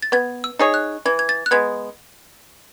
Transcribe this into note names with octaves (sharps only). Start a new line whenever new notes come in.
A6
B3 G#6
E6
D#4 G#4 C#5
F#6
E3 G#6
G#6
A6
F#6
G#3 B3 G#6